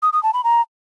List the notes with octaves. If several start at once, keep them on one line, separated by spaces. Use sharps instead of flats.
D#6
D#6
A5
B5
A#5